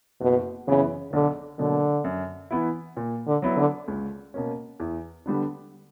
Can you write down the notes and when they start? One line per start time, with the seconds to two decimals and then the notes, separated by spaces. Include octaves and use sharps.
0.21 F#1 B2
0.67 F#2 C#3 E3 B3 E4
1.13 B1 D3
1.59 B2 D3 F#3 A#3
2.04 F#2
2.51 E3 B3 E4
2.97 A#2
3.27 D3
3.42 F#3 B3 E4
3.57 D3
3.88 C#2
4.34 B2 A#3 C#4
4.80 E2
5.26 D3 G3 B3 D4